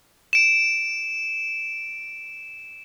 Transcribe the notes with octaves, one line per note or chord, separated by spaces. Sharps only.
D7 E7